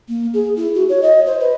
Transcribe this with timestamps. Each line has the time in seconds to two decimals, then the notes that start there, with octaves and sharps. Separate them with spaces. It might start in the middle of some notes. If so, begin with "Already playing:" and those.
0.08 A#3
0.34 G#4
0.56 E4
0.75 F#4
0.89 C#5
1.02 D#5
1.26 C5
1.40 B4